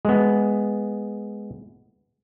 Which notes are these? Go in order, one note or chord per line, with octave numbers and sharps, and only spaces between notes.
G#3 B3